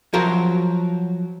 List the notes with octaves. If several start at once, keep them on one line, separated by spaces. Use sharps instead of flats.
F3 F#3 F#4 A#4